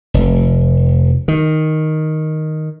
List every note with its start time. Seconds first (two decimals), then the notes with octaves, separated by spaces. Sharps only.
0.14 F1
1.28 D#3